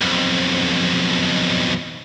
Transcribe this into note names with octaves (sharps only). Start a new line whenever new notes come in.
B1 F2